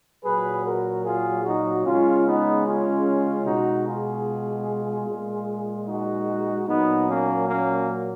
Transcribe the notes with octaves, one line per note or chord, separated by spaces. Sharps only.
A#2 F#3 G#4 B4
F#4 A#4
F4 G#4
D#4 F#4
C#3 G#3 C#4 F4
B3 D#4
C#4 F4
B2 G#3 D#4 F#4
F4 G#4
A#2 G#3
D#4 F#4
A#2 F#3 B3 D#4
A#3 C#4
A#3 C#4